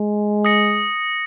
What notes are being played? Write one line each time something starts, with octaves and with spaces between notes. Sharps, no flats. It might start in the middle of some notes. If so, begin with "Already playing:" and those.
Already playing: G#3
D#6 A#6 C#7